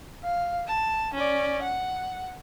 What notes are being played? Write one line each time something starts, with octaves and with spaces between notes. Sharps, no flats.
F5
A5
C#4 D5
F#5